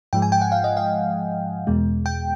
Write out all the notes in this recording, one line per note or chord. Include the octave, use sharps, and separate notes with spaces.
G#2 F3 G#3 G5
G#5
G5
F#5
F5
D#5
F5
E2 B2 G#3
G5